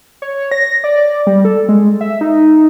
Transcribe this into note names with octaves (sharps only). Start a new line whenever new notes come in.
C#5
A#6
D5
G3
A4
G#3
E5
D#4